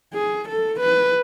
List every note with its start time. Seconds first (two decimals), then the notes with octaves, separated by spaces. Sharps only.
0.14 G#4
0.49 A4
0.80 B4